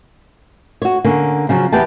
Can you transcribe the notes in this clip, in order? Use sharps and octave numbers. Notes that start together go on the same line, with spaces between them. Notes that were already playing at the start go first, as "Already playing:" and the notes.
F#4 C#5
D3 A#3 C#4
C#3 F3 F#3
E2 G4 B4 A5